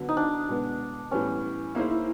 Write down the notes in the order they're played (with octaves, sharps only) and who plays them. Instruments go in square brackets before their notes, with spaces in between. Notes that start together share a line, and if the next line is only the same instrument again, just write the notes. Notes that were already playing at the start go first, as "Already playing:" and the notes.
Already playing: [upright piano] D3 F#3 B3
[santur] D#4
D4
[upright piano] B2 G#3 B3
[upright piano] A2 E3 G3 B3 [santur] C#4
[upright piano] A#3 D#4 G#4 C5 [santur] E4
[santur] E4